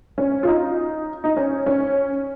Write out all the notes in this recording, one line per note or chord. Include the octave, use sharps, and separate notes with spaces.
C#4
F4
D#4
D#4
C#4
C#4